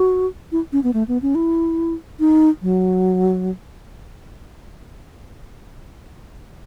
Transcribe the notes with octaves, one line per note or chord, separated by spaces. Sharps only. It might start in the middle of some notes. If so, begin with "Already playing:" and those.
Already playing: F#4
E4
C#4
B3
A3
B3
C#4
E4
D#4
F#3